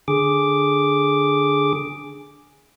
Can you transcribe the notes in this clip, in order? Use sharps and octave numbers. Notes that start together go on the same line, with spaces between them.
D3 G#4 D6